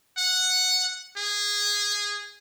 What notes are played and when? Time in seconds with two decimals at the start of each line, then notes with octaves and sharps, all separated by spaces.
0.17 F#5
1.17 G#4